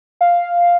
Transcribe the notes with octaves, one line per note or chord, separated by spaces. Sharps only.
F5